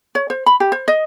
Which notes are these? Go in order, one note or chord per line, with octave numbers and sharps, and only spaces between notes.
C#5
C5
B5
G4
C5
D#5